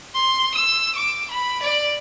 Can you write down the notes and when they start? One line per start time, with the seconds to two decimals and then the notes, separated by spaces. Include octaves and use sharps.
0.14 C6
0.55 E6
0.96 D6
1.31 B5
1.63 D5